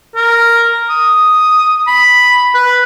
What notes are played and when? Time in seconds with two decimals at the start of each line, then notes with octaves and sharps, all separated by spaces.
0.15 A#4
0.89 D#6
1.87 B5
2.55 B4